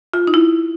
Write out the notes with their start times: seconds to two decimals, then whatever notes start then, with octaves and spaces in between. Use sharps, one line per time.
0.14 F4
0.27 D#4
0.34 E4